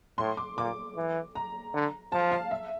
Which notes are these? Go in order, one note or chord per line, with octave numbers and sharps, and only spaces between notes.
A2 C6
D6
A#2 D6
E3
A#5
D3
F3 A5
F5
E5